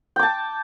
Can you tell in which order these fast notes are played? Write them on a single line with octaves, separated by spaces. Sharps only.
G5 D6 A5